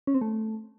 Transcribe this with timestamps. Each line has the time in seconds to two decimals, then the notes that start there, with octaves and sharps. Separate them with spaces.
0.07 C#4
0.14 C4
0.21 A3